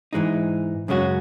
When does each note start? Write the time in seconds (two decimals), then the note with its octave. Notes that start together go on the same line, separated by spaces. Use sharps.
0.13 G#2 E3 G#3 D#4
0.88 F#2 C#3 G#3 C#4 F#4